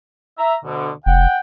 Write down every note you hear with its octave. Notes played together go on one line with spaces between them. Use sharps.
E5 A#5
D2 B2 D3
F1 F#5 G5